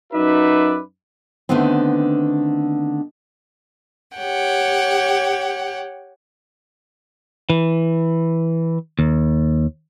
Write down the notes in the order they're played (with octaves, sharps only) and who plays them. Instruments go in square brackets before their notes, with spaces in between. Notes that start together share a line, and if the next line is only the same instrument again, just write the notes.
[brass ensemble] F#2 D#4 F#4 B4 D5 E5
[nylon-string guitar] D3 D#3 A3 B3 C4
[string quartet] G4 C#5 F#5 G5
[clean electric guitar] E3
D#2